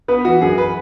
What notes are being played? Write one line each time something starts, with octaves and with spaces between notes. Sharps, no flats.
B3 B4
E3 F#4
F#2 G#4
B4